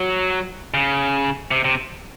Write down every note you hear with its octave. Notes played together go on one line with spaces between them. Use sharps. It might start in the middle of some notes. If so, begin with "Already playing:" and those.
Already playing: F#3
C#3
C3
C3